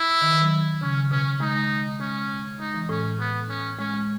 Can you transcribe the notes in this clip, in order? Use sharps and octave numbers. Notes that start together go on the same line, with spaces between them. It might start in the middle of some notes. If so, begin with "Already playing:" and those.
Already playing: E4
D#3
D#3
F#3
C#3 C#4
B2 C#4
G#3 D#4
G#3 C#4
G#3 D#4
E3
A2 C#4
A2 B3
C#4
G#3 C#4
G#3